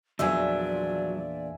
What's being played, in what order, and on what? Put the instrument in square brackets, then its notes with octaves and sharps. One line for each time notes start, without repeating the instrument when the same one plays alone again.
[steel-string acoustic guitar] E2 A#2 D4 [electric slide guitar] F3 F#3 [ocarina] D5 [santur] E5 G#5